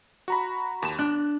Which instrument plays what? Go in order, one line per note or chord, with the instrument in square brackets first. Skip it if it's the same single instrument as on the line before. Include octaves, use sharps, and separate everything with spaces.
[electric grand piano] F#4 A#5 B5
[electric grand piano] D#2 E7 [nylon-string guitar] A5
[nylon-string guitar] D4 [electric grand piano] F#6